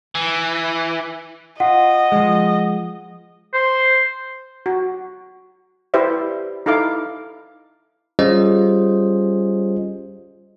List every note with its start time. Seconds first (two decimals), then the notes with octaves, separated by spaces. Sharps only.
0.15 E3
1.60 F4 D#5 F#5
2.12 F3 G#3
3.54 C5
4.66 F#4
5.94 E4 G4 B4 C5 D5 E5
6.66 D#4 E4 A4 F5 D6
8.19 G3 C#4 F4 G#4 C5 D#5